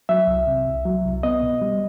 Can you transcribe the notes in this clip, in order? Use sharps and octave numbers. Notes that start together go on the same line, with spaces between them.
F#3 E5
C2
C3
C2
F#3
C2
B3 D#5
B2
G3